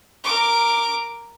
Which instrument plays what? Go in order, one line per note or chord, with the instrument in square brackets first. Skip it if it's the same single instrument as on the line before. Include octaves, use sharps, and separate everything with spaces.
[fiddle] A#4 D6